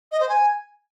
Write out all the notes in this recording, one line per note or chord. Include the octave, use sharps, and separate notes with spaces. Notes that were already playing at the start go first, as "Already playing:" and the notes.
D#5
C5
G#5